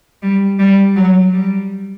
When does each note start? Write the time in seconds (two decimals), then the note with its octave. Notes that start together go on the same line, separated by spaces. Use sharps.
0.22 G3
0.59 G3
0.96 F#3
1.33 G3